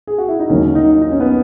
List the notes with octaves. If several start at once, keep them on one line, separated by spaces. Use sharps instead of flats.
G#4
F#4
E4
D#4
D#2 D#3 F#3 C#4
D#4
D#4
C#4
B3